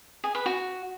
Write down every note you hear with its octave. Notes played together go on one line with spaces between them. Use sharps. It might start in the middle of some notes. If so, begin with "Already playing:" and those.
G#4
B4
F#4